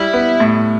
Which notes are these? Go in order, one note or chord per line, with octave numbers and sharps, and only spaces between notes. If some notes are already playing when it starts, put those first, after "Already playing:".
Already playing: G3 E4
B3
A2